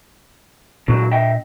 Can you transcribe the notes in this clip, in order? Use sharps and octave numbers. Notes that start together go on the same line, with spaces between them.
C#2 A#2 D3 F#3 D4
D#5 E5 G5